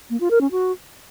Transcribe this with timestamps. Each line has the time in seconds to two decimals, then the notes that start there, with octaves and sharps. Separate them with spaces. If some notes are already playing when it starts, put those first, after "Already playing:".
0.10 A#3
0.20 F4
0.31 A#4
0.41 C#4
0.51 F#4